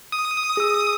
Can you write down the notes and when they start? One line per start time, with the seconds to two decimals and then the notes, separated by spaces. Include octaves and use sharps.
0.12 D#6
0.57 G#4 E6